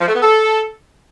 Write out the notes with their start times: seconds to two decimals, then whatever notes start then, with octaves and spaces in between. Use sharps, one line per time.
0.01 F3
0.08 A3
0.15 B3
0.22 A4